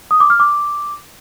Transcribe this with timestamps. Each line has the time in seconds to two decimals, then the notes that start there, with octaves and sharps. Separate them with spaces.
0.11 D#6
0.20 D6
0.30 F6
0.40 D6